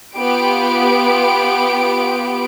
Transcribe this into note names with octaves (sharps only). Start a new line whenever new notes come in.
B3 F4 G4 D7